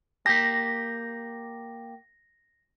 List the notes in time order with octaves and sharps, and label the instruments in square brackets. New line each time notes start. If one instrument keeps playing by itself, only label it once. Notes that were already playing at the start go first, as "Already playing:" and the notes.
[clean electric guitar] A#3 G4 [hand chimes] A#6